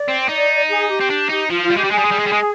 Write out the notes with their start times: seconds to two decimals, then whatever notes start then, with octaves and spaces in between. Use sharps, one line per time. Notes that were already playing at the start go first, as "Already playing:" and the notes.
Already playing: D5
0.08 C4
0.28 D#4
0.69 G#4
0.89 G4
1.00 C4
1.10 D4
1.29 D#4
1.49 F3 F4
1.63 F4
1.70 G3
1.76 G#3 G4
1.84 G3
1.90 G#3 G#4
1.98 G3
2.05 G#3
2.12 G3
2.20 G#3
2.27 G3
2.33 G#3